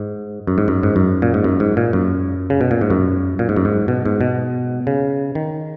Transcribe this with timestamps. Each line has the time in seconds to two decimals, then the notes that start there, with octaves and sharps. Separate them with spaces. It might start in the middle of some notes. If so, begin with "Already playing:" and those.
Already playing: G#2
0.47 F#2
0.58 G#2
0.68 F#2
0.83 G#2
0.96 F#2
1.22 A#2
1.34 G#2
1.44 F#2
1.60 G#2
1.77 A#2
1.93 F#2
2.50 C#3
2.61 B2
2.71 A#2
2.81 G#2
2.90 F#2
3.39 A#2
3.49 G#2
3.56 F#2
3.65 G#2
3.88 B2
4.06 G#2
4.21 B2
4.87 C#3
5.35 D#3